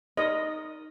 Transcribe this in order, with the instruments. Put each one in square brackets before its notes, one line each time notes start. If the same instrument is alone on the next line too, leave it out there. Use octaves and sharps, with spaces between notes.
[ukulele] D#4 A#4 D5 [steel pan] D#5